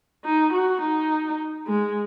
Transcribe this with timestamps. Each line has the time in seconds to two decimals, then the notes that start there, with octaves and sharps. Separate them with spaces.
0.25 D#4
0.53 F#4
0.81 D#4
1.67 G#3